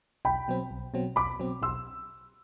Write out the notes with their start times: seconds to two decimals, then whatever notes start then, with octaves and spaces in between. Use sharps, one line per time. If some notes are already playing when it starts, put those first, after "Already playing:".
0.25 B1 G5 B5
0.48 B2 F#3 C4
0.71 B1
0.94 B2 F#3 C4
1.16 B1 B5 D6
1.40 B2 F#3 C4
1.62 B1 C6 E6